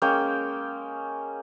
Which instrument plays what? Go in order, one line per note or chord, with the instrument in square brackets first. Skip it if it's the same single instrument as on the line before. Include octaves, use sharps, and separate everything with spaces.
[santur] G#3 A#3 C#4 G5